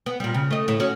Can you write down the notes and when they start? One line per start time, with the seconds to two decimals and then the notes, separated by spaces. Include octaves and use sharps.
0.06 B3
0.20 A#2 G3
0.34 C#3
0.51 A3 D#5
0.68 A2
0.80 C#4 F#4